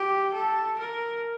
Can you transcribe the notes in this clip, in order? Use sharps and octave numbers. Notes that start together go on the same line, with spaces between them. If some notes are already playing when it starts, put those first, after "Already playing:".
Already playing: G4
A4
A#4